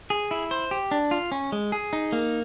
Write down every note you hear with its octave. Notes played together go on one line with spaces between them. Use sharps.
G#4
E4
C5
G4
D4
F4
C#4
G#3
G#4
D#4
A#3